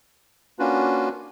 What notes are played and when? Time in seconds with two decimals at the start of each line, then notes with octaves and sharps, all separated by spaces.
0.59 A#3 C#4 D4 F4 F#4 B4